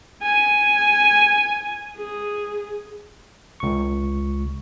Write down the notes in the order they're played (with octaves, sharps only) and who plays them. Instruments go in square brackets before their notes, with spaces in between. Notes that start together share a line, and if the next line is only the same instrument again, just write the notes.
[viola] G#5
G#4
[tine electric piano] C#2 C#6